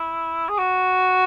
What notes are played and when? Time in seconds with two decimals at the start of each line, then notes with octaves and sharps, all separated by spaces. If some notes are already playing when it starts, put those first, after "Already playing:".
Already playing: E4
0.49 G#4
0.59 F#4